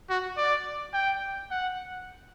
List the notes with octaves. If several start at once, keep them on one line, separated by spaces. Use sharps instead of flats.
F#4
D5
G5
F#5